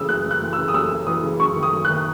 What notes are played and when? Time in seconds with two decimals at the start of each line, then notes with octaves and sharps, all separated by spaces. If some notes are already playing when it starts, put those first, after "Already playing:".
Already playing: C#3 E3 D#6 E6
0.09 F#2 F#6
0.25 F#2
0.31 F#6
0.42 E3
0.53 E6
0.58 C#3
0.68 D#6
0.74 F#2 E6
0.91 F#2
1.07 E3 D#6
1.23 C#3
1.40 F#2 C#6
1.56 D#3
1.63 D#6
1.72 F#2
1.85 F#6
1.90 D#3